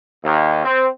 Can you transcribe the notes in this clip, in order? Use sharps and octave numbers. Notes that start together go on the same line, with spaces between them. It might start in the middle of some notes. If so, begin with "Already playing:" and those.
D#2
C4